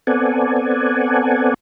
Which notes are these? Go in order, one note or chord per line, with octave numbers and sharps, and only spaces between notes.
B3 C4 A4 D5 F#5 G#5